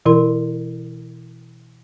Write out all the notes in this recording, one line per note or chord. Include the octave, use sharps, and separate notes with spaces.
B2 E3 E4 A#4 C6